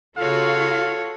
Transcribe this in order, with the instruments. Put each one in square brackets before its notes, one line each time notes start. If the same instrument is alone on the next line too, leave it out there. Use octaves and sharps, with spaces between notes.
[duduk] C#3 [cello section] F4 F#4 [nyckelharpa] A4 C#5 [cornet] F5